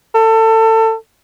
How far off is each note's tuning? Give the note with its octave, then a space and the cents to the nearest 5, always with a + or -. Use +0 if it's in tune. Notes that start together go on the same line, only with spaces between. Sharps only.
A4 +25